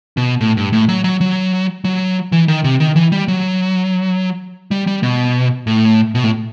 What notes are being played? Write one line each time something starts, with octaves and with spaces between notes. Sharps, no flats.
B2
A2
G2
A2
F#3
F#3
F#3
F#3
E3
D#3
C3
D#3
E3
G3
F#3
G3
G3
B2
A2
B2
A2